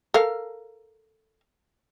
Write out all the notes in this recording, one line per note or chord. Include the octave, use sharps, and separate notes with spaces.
A4 A#4 F5